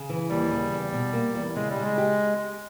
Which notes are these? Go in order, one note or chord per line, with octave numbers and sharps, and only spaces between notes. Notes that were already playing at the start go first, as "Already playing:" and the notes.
Already playing: C#3
E3
D#2 G3
C#3
E2
B2
A#3
E2
C#3 G#3
G3
C#3
G#3
G4